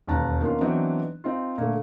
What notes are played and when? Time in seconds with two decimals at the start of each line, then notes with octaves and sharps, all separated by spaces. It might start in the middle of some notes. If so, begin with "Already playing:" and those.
0.07 E1 D#2 C#4 A5 A#5 F#6
0.41 D#3 A#3 B3 C#4 D4 F4
0.61 E3 F#3 B3 C4 D4 D#4
1.24 C4 D#4 F4
1.58 A#2 D3 A3